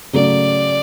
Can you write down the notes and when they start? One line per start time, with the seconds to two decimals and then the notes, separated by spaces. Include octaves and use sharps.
0.13 C#3 F#3 A3 C#4 D5